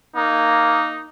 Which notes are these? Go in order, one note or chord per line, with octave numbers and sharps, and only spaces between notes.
A#3 D#4